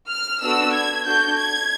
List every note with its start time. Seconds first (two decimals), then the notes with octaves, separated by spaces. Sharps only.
0.10 F6
0.42 B3 D4 F#4 A4 E6
0.74 G#6
1.05 D4 F#4 A4 G6
1.38 G#6